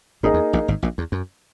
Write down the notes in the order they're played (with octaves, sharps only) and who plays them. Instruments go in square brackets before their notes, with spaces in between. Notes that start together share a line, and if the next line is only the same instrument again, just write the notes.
[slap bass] G#1 G#2 [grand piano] A#3 D#4 G#4 D#5
[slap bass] E2
A#1 A#2
G#1 G#2
A#1 A#2
E2
F#2